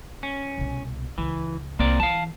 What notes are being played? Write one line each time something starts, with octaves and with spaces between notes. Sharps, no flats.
C#4
C2 B2
C#2 E3
C2 A#3 C4 D5
E3 F5 A5